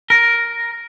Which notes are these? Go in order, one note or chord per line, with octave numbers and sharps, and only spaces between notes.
A#4